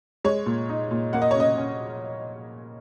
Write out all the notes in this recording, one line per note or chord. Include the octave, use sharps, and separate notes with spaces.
G#3 C#5
A#2
D#4
A#2
A#3 F#5
D#5
C#5
C#3 D#5
C#4